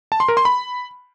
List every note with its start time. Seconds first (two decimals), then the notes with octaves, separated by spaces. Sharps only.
0.12 A5
0.20 C6
0.28 A#4
0.37 C6
0.45 B5